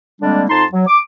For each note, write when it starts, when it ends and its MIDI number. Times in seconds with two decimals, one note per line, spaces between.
0.21 0.44 50
0.21 0.44 55
0.21 0.44 56
0.21 0.44 58
0.21 0.44 60
0.21 0.44 62
0.49 0.64 41
0.49 0.64 63
0.49 0.64 81
0.49 0.64 84
0.72 0.87 54
0.87 0.99 86